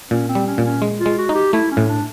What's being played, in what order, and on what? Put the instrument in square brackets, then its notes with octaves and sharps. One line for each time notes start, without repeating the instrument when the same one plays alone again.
[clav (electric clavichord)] A#2 [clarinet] C#4
[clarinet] C4
[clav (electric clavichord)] G3
[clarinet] C#4
[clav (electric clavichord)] A#2
[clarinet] C#4
[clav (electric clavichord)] G#3
[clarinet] F4
[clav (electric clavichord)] G#3
[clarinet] F#4
[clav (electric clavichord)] D#4
[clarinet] G4
[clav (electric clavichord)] A3 [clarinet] E4
[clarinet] C#4
[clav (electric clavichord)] A2
[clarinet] D4